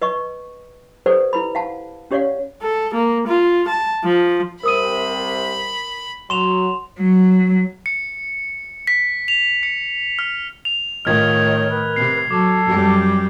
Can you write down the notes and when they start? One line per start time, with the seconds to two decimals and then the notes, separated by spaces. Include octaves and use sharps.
0.02 B4 D#5 C#6
1.06 G4 A4 B4 C5 D5 F#5
1.33 E4 B4 B5
1.55 F5 F#5 A5
2.11 C#4 G4 C#5 D5 F5 F#5
2.62 A4
2.94 A#3
3.27 F4
3.68 A5
4.04 F3
4.63 C2 C3 A#4 C5 B5 D#6 D#7
6.30 F#3 C6 E7 F7
6.99 F#3
7.86 C#7
8.87 B6
9.28 F7
9.63 C#7
10.19 F6
10.65 F7
11.05 A2 D#3 F4 C#5 D#5 F6 G#6
11.67 A#4 B4
11.96 C3 C7
12.31 F#3 A4 D6
12.65 F#2 G3